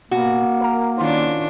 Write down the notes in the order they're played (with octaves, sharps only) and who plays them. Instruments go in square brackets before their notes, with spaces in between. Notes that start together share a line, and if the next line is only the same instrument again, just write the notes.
[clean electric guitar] B2 [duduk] A#3 [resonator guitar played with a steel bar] F#4
[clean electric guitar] A#4 B4
[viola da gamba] D#3 C#4 D4 [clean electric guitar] F4 C5